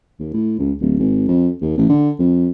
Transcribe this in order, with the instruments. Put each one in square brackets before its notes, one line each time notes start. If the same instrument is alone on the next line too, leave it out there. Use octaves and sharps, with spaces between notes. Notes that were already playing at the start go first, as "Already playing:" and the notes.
[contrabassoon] D#2
A2
C#2
D1
G#1
F2
D#2
A1
D3
F2